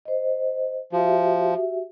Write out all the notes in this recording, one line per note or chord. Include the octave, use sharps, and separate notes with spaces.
C5 D#5
F3 F#4 G4 E5